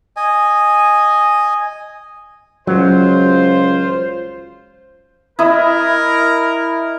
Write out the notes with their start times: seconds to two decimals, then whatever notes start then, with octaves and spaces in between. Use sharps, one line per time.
0.17 D#5 G#5
2.67 C#2 F#3 F4 C5
5.39 E4 A#4 D#5